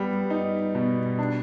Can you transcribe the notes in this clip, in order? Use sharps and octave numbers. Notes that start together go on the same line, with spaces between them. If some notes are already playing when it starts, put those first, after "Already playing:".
Already playing: G3 B3
D#4
B2
D4